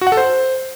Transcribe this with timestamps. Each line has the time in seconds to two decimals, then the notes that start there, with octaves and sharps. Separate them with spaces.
0.01 F#4
0.07 F#5
0.12 A4
0.17 C5